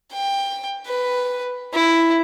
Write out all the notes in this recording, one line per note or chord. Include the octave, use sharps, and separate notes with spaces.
G5
B4
E4